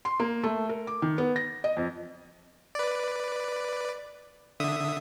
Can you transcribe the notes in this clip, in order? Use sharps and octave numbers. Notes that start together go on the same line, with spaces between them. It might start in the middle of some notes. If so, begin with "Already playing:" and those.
C6
A#3
A3
A#4
D6
D#3
B3
A#6
D#5
F2
B4 D5
D3 E5 D#6